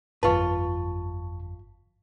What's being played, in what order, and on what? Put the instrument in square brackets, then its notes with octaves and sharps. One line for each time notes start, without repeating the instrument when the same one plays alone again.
[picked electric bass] G1 F2 [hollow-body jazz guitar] F4 B4 [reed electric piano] A5 C#6